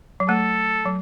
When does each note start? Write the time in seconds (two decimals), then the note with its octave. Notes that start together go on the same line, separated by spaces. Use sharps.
0.20 F#3
0.28 A3 A4
0.86 F#3